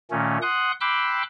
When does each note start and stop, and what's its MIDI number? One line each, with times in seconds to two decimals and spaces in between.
0.11 0.38 46
0.11 0.38 51
0.11 0.38 57
0.11 0.38 61
0.42 0.72 78
0.42 0.72 84
0.42 0.72 87
0.42 0.72 90
0.81 1.23 79
0.81 1.23 83
0.81 1.23 84
0.81 1.23 86
0.81 1.23 88
0.81 1.23 90